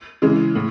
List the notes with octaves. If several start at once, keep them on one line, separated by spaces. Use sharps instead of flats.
C#3 E3 G#3
A2